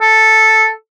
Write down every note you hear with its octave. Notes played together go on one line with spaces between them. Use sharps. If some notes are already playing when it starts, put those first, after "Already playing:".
A4